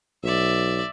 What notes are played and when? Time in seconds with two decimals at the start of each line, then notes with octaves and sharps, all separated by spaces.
0.23 B1 D5 E5